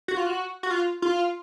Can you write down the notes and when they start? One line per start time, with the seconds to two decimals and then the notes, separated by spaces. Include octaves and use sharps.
0.08 F#4
0.17 F4
0.27 F#4
0.63 F#4
0.71 F4
1.02 F4